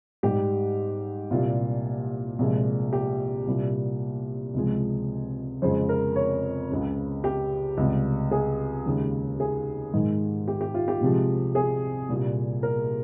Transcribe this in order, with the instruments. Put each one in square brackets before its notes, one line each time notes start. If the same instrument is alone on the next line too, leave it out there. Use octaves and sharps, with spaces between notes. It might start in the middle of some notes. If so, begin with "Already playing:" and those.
[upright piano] G#2 G3 G4
C2 A#2 G3 F4
C2 A#2 F3 G#3
G4
C2 A#2 G3
C#2 C3 F3 G#3
F2 C#3 G#3 C5
A#4
C#5
C#2 C#3 G#3
G4
C#2 C3 G3
G#4
D#2 C#3 G#3
G#4
G#2 D#3 G#3
G4
G4
F4
G4
C2 C3 F3 G#3
G#4
C2 A#2 G3
A#4